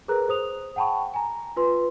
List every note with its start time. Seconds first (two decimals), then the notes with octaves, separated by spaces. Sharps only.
0.08 G#4 A#4 B4 A#5 F#6
0.28 G#4 C5 D#6 F7
0.76 F#5 G5 A5 B5 C#6
1.14 G#5 A#5
1.56 F4 B4 C6